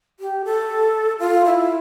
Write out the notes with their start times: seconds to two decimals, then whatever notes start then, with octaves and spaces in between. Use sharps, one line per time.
0.20 G4
0.45 A4
1.20 F4
1.45 E4